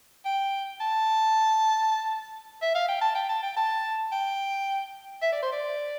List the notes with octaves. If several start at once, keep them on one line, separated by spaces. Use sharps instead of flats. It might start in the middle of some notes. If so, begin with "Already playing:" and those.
G5
A5
E5
F5
G5
A5
G5
A5
G5
A5
G5
E5
D5
C5
D5